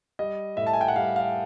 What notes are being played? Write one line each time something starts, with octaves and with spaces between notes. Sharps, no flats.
G3 D#5
A2 E5
A5
G#5
G5
F#5
G3 F5
F5